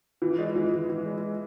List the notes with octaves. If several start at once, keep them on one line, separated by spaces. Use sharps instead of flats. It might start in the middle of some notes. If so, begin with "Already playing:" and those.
E3
G#3
E3
E3
E3
G#3